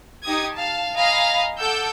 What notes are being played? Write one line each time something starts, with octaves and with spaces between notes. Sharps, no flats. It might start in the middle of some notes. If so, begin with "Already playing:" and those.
D#4 G4 D#6 G#6
F5 A5
D#5 F5 G#5 A#5 B5
A4 F#5 D6 E6 G6